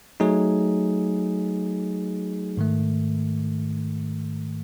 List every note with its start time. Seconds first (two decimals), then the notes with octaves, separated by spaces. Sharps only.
0.20 F#3 A3 D#4 G#4
2.57 G#2 D#3 A3